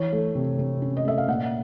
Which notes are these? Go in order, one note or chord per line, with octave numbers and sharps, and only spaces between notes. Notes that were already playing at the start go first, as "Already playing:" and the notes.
Already playing: E3 C#5
A3
C3
C3
C#4
D#5
A3 E5
F5
A#2 F#5